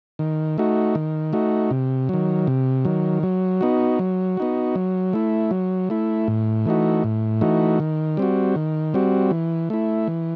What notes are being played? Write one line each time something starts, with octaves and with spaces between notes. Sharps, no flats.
D#3
A3 D#4 F#4
D#3
A3 D#4 F#4
C3
D#3 F#3
C3
D#3 F#3
F#3
B3 D#4 F#4
F#3
B3 D#4 F#4
F#3
A3 E4
F#3
A3 E4
A2
E3 A3 D#4 F#4
A2
E3 A3 D#4 F#4
D#3
G3 C4 F#4
D#3
G3 C4 F#4
E3
A3 E4
E3